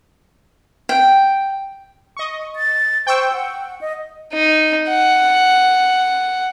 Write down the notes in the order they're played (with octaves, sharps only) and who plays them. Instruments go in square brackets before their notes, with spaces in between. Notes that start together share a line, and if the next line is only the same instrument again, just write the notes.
[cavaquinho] G5
[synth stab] D#5 C#6
[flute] A6
[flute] C5 [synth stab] G5 C#6 E6
[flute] F#5
D#5
[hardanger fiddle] D#4
F#5